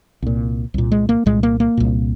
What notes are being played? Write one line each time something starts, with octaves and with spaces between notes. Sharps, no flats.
C2 A#2
C2 A#2
G#3
A#3
C2 A#2 G#3
A#3
A#3
C2 A#2